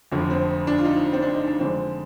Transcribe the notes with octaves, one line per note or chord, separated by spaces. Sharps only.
F1 F2 D3
C4
D4
F4
D#4
C4
D4
D#4
D4
F2 D3 G#3 C4